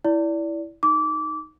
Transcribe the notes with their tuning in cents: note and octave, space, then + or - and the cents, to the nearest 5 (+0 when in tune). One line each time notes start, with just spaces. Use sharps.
E4 +0 D5 -20
D#4 +0 D6 -20